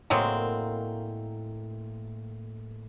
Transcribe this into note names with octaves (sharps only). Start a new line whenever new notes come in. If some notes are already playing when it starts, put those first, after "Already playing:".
A2 F#3 G#3 A#3 C4